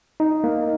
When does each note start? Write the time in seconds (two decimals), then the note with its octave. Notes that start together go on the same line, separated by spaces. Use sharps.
0.20 D#4
0.44 A#3